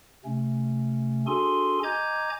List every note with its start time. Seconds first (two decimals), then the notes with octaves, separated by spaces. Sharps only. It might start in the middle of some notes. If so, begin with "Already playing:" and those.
0.25 C3 A3 C#4
1.27 D4 F#4 G#4 A4 G#5 C6
1.83 D#5 G#5 A#5 D6 G6 G#6